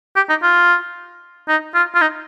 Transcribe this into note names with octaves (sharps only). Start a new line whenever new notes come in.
G4
D#4
F4
D#4
F4
F4
D#4